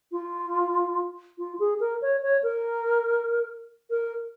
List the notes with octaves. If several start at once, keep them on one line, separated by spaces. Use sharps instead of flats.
F4
F4
G#4
A#4
C#5
C#5
A#4
A#4